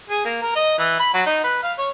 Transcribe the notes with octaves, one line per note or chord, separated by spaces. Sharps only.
G#4
A#3
A#4
D#5
E3
B5
F#3
D#4
B4
F5
C#5